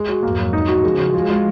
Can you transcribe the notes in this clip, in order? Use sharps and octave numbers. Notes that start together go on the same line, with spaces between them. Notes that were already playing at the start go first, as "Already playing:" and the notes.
Already playing: G#3
F#4
F2 G#2 A#3
F#3
D#4
F#4
C#3 F3 G#3
F#4
F3 G#3 F4
F4